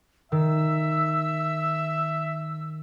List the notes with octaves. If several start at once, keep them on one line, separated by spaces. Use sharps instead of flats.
D#3 E5 E6